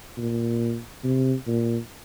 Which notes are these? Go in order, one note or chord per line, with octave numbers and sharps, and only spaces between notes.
A#2
C3
A#2